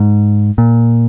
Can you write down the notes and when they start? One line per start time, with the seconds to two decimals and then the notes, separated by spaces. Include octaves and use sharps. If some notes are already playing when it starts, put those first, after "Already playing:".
Already playing: G#2
0.58 A#2